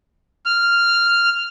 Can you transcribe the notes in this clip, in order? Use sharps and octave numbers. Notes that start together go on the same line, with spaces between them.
F6